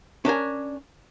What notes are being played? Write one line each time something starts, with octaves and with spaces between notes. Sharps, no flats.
C#4 D4 A#4 G#5